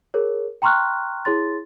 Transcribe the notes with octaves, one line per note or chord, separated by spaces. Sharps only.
G#4 A#4 C#5
G5 A#5 C6 C#6 F6 F#6
E4 G#4 C#5 C6 A6